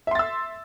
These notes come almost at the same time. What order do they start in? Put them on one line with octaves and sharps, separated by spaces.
E5 C6 A6 E6